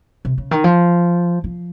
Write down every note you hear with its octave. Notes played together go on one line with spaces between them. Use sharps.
C3
C#3
D#3
F3
F3